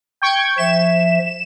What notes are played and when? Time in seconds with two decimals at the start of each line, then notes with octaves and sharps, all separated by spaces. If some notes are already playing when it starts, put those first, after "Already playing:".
0.22 G5 C#6 G#6
0.58 F3 E5 E7